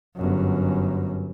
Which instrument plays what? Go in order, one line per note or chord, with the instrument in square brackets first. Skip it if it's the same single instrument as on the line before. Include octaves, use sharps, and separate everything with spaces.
[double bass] G1 F#2